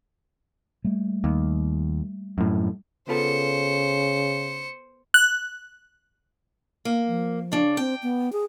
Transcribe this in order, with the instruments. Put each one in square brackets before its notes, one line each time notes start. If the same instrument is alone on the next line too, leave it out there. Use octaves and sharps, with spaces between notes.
[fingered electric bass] G3 A3 A#3
[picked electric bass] D#2
F#2 A2
[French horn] C#3 [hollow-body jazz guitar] B3 F4 A4 [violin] C5 C#7
[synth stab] F#6
[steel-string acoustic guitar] A#3
[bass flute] F3
[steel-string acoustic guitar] C#3 D4
[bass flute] C4 [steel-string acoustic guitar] G5
[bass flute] B3
G#4